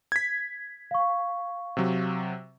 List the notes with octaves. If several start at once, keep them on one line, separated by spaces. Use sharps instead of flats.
G#6 B6
F5 C#6
C3 F#3